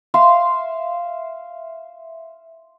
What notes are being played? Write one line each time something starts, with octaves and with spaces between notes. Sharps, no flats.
E5 F5 C6